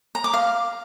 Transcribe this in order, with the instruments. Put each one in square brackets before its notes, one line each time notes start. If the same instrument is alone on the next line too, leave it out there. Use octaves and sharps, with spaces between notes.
[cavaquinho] A#5
D6
F5